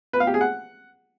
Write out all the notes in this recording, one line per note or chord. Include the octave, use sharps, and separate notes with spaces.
B4
F5
G4
G#4
F#5